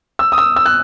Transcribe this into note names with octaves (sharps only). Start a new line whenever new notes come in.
E6
D#6
E6
E6
F#6